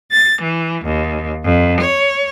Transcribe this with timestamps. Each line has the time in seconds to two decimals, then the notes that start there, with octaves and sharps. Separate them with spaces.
0.11 A6
0.44 E3
0.84 D#2
1.44 F2
1.81 C#5